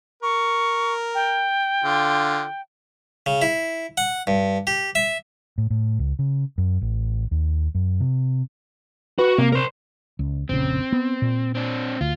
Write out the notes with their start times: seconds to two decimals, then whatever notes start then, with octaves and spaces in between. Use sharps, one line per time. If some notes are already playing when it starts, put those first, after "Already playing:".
0.23 A#4 C#6
1.15 G5
1.84 D3 F4
3.26 C#3
3.42 E4
3.97 F#5
4.27 G2
4.67 G4
4.95 E5
5.58 A2
5.70 A2
5.99 C#2
6.19 C#3
6.58 F#2
6.81 A1
7.31 D#2
7.75 F#2
8.00 C3
9.19 F#4 B4
9.38 C3 A#3
9.52 A#4 C5
10.19 C#2
10.49 F1 A#1 C#3 C4
10.93 B3
11.22 A#2
11.55 C4 D4
12.01 D2 F4